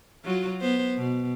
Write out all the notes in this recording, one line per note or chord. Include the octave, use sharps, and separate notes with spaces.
F#3 F4 F#4
B3 C5
B2